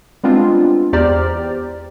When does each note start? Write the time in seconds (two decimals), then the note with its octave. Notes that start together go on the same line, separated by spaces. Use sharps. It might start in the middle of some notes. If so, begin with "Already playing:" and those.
0.23 G3 G#3 B3 C4 D4 F4
0.93 E2 G4 C5 D5 A#5 F6